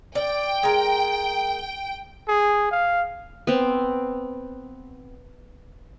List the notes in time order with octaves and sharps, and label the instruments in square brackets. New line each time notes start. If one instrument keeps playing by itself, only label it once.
[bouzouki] D5 [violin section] G5
[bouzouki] G#3 A#4
[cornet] G#4
F5
[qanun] B3 C4